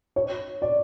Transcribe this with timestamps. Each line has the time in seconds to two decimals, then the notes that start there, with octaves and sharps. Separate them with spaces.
0.16 C#5
0.62 D5